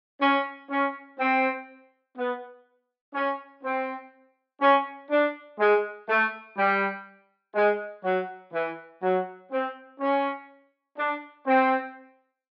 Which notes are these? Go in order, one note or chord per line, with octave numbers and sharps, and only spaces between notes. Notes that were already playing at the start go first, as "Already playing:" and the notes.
C#4
C#4
C4
B3
C#4
C4
C#4
D4
G#3
A3
G3
G#3
F#3
E3
F#3
C4
C#4
D4
C4